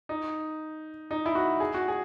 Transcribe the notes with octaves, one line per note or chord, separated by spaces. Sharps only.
D#4
D#4
E4
F#4
G#4
F#4
G#4